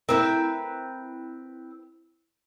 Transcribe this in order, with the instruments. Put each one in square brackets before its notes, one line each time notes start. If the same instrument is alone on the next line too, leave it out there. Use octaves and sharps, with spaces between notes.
[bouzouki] C4 B4 [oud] E4 A#4